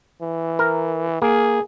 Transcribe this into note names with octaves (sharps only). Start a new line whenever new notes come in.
E3
A#4
A#3 G#4